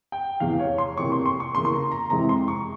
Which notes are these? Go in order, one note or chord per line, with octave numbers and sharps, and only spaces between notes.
G5
F1 E2 E3 F5
C#5
C6
F1 F2 E3 A#3 C#6
C6
C6
C#6
E2 C#3 E3 A#3 C6
C6
A#5
A#5
F2 C3 E3 G#3 C4 A#5
C6
C#6